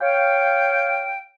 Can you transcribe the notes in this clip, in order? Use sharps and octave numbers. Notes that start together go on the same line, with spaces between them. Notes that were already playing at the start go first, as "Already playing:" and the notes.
C#5 F5 G5